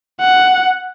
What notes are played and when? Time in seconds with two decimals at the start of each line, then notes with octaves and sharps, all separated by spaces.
0.21 F#5